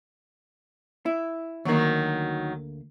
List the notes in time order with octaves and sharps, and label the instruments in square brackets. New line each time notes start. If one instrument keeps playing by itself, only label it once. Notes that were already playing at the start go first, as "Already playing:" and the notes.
[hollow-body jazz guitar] E4
[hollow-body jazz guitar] D2 A#3 [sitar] D#3 F#3